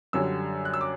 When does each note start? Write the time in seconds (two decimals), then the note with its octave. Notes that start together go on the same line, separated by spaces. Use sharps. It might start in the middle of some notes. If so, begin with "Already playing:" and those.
0.13 F#2 D3 G3 C#4 E6
0.65 F#6
0.74 E6
0.81 D6